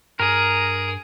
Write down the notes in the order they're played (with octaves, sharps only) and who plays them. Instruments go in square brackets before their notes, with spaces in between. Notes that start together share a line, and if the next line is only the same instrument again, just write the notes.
[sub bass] G2 [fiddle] G#4 [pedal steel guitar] A#4